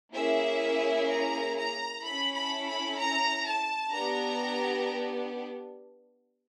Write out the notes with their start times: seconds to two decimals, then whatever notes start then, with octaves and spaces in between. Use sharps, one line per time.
0.13 A#3 C#4 E4 G#4 E5
1.08 A#5
1.56 A#5
2.03 C#4 E4 A4 B5
2.35 B5
2.67 B5
2.97 A#5
3.46 A5
3.92 B3 D4 G4 A#5